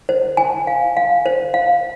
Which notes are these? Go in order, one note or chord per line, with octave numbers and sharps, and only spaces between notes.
C5
G#5
F5
F5
C5
F5